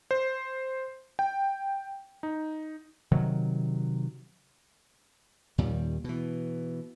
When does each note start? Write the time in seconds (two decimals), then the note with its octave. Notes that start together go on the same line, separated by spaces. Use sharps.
0.11 C5
1.19 G5
2.23 D#4
3.12 C3 D#3 F#3
5.58 D#2 A#2 D#3 G3
6.04 B2 E3